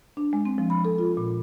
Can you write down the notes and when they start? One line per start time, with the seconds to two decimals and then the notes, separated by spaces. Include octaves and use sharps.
0.17 D4
0.33 G#3
0.45 C4
0.58 F3
0.70 B5
0.85 A4
0.98 F4
1.17 A#2